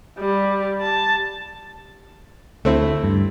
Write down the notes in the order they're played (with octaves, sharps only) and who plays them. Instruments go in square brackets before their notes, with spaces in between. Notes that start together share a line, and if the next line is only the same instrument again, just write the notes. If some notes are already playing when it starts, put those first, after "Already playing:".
[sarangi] G3
A5
[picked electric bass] D2 [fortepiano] A3 C4 E4
[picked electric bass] G2